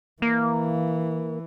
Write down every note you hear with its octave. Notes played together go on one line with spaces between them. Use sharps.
E3 A#3